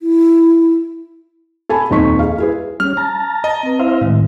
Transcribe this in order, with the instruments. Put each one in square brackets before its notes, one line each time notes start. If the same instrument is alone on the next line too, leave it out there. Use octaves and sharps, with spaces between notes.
[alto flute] E4
[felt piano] A4 G#5 A5 B5
D#1 F2 D#4 C6 C#6 B6
G#4 F5
E4 G#4 B4
[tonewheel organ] G3 C#4 [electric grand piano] F6
[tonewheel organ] A5 A#5
[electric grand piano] D#5
[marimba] C4 B4
[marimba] E4 [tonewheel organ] C5 E5 F5
[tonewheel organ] A2 [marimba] D#3 G#3